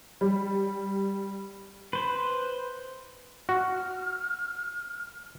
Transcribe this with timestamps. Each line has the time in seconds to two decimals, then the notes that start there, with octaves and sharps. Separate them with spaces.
0.21 G3
1.93 B4 C5
3.49 F#4 F6